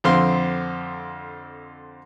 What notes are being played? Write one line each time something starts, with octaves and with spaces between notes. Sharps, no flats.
F2 D3 C4 F5 C6